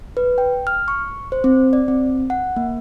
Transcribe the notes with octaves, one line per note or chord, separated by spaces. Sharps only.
B4
G5
F6
C#6
C5
C4
D5
C4
F#5
A#3